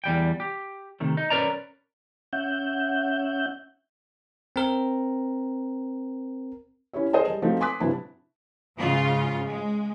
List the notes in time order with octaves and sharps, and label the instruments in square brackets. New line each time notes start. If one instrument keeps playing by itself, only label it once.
[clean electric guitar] E2 G3 G5
G4
C3 D#3 A3
D#4
C#4 A#4 B4 D5 A#5
[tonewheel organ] C#4 E5 F#5 G6
[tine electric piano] C4 A#4
[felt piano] C#4 E4 G4 C#5 E5
G#4 A#4 C5 D#5 G#5 A5
G3
F3 A3 C4 D#4 F#4
G#5 C6 D6 D#6 F#6 B6
G2 C3 F#3 C4 E4 A5
[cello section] G#2 C#3 F4
G#3